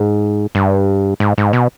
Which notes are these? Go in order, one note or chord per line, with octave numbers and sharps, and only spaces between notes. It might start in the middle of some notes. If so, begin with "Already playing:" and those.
Already playing: G#2
G2
G#2
G#2
B2